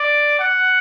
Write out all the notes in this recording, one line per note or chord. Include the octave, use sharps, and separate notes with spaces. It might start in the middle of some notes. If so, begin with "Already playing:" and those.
Already playing: D5
F#5